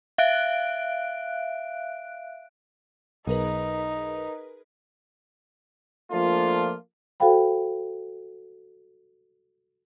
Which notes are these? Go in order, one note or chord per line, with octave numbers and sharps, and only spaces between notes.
E5 F5 F#6 D7
B1 D#4 G#4 A#4 B4
F3 A3 A#3 D4 F4
F#4 A4 C5 F5 G5 B5